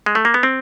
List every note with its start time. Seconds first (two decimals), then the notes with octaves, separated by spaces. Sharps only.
0.06 G#3
0.15 A3
0.25 A#3
0.34 B3
0.43 C4